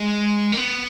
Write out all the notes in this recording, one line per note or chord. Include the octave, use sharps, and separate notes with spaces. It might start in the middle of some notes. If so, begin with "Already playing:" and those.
Already playing: G#3
A#3
B3